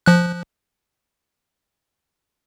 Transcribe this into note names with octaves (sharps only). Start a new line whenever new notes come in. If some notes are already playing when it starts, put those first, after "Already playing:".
F3 F#6